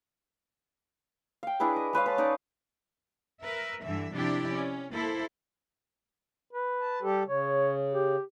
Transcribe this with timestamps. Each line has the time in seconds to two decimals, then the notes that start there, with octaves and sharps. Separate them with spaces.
1.43 F5 G5
1.60 D4 E4 G#4 B4
1.76 D#5
1.93 G#3 B4 C#5 F5
2.06 B4 A5
2.17 C#4 D#4 D5
3.42 A#4 B4 E5
3.82 G2 D3 E3 E5
4.15 C3 F3 D4 E4 G4 D5
4.51 C#4
4.94 A#3 E4 A4 C5
6.53 B4
6.81 A5
7.02 G3 G4 A4
7.27 C#3 C#5
7.93 G4